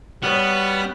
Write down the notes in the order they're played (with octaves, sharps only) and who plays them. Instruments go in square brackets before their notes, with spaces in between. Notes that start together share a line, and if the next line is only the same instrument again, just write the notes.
[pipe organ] G3 F6 F#6 [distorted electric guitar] B3 [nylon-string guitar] F#4 C#5 D#5